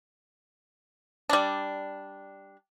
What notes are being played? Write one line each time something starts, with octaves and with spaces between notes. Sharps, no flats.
G3 D4